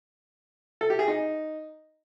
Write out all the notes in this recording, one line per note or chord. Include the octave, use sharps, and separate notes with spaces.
A4
G4
G#4
D#4